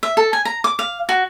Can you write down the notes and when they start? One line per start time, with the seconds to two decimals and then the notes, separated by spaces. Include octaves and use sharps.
0.03 E5
0.17 A4
0.33 G#5
0.45 A#5
0.64 D6
0.79 F5
1.09 F#4